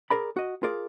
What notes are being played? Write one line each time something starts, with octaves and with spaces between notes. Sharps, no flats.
G#4 A#4 D5 B5
F#4 D#5
F4 G#4 A#4 D5